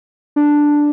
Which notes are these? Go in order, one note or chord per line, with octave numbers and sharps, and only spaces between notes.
D4